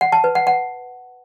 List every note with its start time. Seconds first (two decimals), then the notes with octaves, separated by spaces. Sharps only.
0.01 F#5
0.12 A5
0.24 B4
0.35 F#5
0.47 F#5